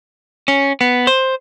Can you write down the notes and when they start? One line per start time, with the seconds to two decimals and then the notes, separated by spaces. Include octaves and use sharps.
0.48 C#4
0.81 B3
1.07 C5